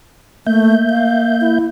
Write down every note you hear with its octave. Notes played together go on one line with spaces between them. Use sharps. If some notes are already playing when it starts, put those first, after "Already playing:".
A3 A#3 E5 G6
F5
E4